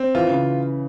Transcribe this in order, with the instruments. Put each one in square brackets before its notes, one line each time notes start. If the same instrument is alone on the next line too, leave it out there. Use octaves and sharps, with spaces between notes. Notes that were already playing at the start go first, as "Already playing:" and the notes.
Already playing: [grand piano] C4
[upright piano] E3 [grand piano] F4
[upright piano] C#3